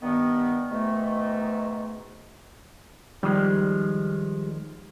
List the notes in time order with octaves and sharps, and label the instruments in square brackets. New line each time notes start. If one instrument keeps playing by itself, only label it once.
[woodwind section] G2 D#3 B3
G#2 B2 D#3 A3
[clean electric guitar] D#3 F3 G#3 [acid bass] G3